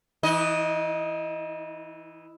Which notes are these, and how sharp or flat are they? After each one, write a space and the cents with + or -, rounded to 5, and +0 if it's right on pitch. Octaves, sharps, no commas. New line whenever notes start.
E3 +0 D#4 +45 D#5 +0